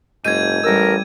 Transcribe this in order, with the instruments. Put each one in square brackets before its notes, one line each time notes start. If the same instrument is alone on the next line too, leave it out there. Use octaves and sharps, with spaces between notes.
[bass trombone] F#1 [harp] G#2 G6 [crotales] G#6 D#7
[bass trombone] A1 [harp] G3 E6 [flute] A#4